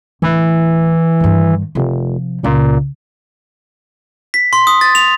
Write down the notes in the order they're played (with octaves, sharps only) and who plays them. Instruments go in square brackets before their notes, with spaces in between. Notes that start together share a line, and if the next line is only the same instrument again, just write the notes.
[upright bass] D1 [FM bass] E3
[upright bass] G2 D#3
[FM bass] F1 [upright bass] C3 F3
[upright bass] G#1 C#2 [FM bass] A#2
[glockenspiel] B6
C6
D#6
A6
F7